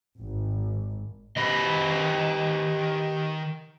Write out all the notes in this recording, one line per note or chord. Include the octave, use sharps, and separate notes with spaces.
G#1
D#3 G4 B4 D#5 B5